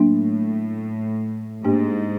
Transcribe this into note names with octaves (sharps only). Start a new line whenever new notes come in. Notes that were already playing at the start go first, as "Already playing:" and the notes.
Already playing: A2 F#3 A#3 D4
G#2 A#3 D4 G4